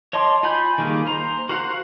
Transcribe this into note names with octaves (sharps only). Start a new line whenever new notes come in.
C#5 D#5 A5 C6 D6
F4 F#5 G#5 B5 G6
D#3 G3 A#3 G#4
C5 A#5
F#4 A#4 C5 F5 F#5